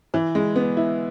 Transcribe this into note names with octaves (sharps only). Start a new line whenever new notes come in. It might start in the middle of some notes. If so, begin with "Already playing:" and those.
E3
G#3
B3
E4